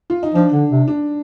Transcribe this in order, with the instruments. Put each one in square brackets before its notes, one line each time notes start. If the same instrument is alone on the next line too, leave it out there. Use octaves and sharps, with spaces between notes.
[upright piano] F4
D#4
[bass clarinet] F3 [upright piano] D4
[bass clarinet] D3
C3
[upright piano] D4